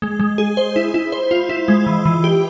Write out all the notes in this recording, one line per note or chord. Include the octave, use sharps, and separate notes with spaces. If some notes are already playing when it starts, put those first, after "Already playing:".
G#3
G#3
G#4
C5
E4
E4
C5
F4
E4
G#3
E3
E3
G4